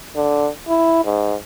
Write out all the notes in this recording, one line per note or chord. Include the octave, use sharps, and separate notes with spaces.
D3
E4
G#2